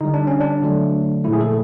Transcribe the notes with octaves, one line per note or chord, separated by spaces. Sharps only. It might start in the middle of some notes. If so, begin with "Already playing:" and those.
D3 G3 D#4
D4
C#4
D4
D3 F#3 A3
A#2 F3 A3 E4
G#4
A4